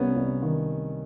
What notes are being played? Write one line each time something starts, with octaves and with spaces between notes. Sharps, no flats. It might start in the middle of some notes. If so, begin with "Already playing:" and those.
Already playing: C2 B3 C#4
C2
D#3